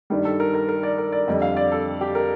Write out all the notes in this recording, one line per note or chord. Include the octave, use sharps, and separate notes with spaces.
G2 D#3 G3
A4
A#4
A#4
A#4
D5
A#4
D5
F2 D3 G3 D#5
F5
D5
A4
G4
A#4